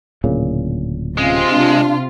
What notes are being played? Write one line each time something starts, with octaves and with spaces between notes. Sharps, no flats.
D1 A#2 C#3
C3 G#3 C#4 F4
D4